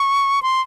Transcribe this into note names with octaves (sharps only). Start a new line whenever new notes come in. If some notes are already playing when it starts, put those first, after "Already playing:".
Already playing: C#6
C6